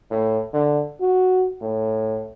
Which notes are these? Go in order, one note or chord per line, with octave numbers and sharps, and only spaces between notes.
A2
D3
F#4
A2